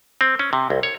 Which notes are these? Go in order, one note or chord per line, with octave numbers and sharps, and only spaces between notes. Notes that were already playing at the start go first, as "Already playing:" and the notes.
C4
C#4
C3
C2
C#5